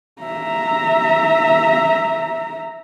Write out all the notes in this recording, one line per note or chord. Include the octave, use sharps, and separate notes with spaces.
E5 A#5